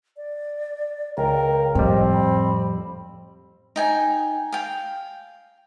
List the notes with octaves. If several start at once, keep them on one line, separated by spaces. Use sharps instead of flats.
D5
C#2 A#4 G5
F2 A2 G3 C4 D#5
B5
D#4 G5 G#5
F5 G5